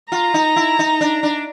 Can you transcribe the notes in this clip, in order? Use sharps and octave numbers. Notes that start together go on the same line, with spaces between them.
F4 A#5
D#4
E4
D#4
D4
D4